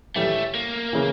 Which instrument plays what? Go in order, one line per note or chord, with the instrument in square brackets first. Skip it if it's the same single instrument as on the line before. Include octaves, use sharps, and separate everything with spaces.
[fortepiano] A2 E3 G3 [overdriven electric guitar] A3
[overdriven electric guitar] A#3
[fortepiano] C#3 E3